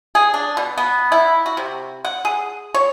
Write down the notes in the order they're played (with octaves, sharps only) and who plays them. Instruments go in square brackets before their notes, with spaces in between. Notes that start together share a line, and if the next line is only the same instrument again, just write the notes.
[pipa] G#4
D4
B2
B3
E4
F#4
C3
F#5
G#4
C#5